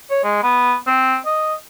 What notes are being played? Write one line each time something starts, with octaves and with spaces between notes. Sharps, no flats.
C#5
G#3
B3
C4
D#5